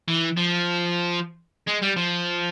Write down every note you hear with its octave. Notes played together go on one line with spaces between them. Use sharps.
E3
F3
G#3
G3
F3